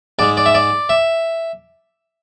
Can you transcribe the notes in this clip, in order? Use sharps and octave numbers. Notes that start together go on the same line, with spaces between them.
G#2 G#3 D5
D5
E5
D5
E5